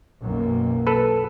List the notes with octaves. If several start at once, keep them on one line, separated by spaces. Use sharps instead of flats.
B1 F#2 A#3
A4 B4